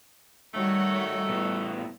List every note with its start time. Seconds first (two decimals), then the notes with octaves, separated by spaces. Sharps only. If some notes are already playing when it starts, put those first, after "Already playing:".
0.54 D#3 G3 A3 F#4 C#5
1.30 A2 B3